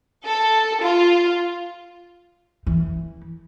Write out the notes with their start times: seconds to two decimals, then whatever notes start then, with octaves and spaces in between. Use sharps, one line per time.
0.24 A4
0.80 F4
2.67 E3